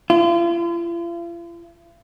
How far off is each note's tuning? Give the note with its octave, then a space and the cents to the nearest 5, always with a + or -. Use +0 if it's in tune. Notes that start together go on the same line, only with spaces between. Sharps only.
F4 -45